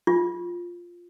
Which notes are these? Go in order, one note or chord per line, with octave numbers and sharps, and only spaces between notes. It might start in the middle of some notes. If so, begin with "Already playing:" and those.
F4